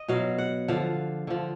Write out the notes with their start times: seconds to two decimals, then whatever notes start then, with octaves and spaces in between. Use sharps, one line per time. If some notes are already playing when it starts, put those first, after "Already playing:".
Already playing: D#5
0.08 B2 F#3 F5
0.38 F#5
0.68 D3 F3 F5
1.27 D3 F3